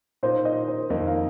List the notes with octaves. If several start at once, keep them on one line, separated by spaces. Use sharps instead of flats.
A#2 A#3 D#4 C5
D#5
C5
F2 D#3 A#3 D#4 D#5
F5